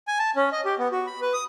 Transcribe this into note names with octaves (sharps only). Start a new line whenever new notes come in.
G#5
A5
C#4
D#5
G4
B3
F#4
B5
B4
D#6